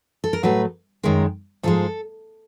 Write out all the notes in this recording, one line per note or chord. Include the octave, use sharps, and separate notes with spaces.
A4
A#4
A2 F#3 A3 B4
F#2 D#3 G#3 A#4
G#2 F3 G#3 A4